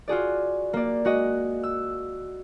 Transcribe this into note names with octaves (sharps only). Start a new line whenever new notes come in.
F4 F#4 G#4 D5
A#3 D5
G#3 F#4 D#5
E6